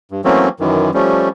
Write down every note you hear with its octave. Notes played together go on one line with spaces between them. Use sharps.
G2
E3 F#3 A3 A#3 C4 C#4
F#2 D#3 E3
F3 G3 A3 C#4